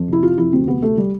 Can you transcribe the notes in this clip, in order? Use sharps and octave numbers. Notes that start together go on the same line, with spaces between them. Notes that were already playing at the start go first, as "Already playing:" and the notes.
Already playing: F2
C3 E4
C3 F4
F2 E4
D2 C4
C3 B3
D2 A3
G3